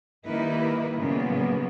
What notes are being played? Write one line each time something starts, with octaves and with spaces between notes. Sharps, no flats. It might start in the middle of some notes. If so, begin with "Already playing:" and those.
D#3 G3 A#3 D#4 E4 B4
A#2 C#3 F#3 A#3 B3